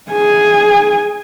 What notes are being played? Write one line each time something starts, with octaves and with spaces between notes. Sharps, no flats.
G#4 G#5